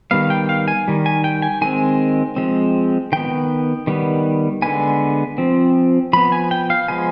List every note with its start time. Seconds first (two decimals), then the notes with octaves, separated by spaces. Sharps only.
0.11 D#3 G3 B3 F5
0.30 G5
0.49 F5
0.68 G#5
0.88 D#3 G3
1.06 G#5
1.24 G5
1.42 G#5
1.61 D#3 G#3 C4 G#5
2.36 F3 G#3 C4
3.12 D#3 B3 G5
3.87 D#3 G3 B3
4.62 D3 G#3 B3 G#5
5.38 F3 C4
6.13 F3 B3 B5
6.32 G#5
6.51 G5
6.70 F5
6.88 F3 G#3 B3 G#5